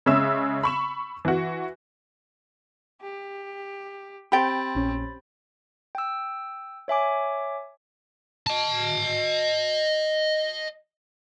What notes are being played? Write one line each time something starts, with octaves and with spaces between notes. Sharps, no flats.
C#3 G#3 C#4 E5 E6 E7
B5 C#6 E7
E3 F#4
G4
C4 G4 G5 B5 A6
A#1 C#4
G5 E6
C#5 E5 G#5 D6
D#5 A5